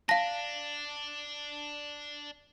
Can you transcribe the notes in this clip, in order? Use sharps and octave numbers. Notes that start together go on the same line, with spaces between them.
D4 F5 A5 A#6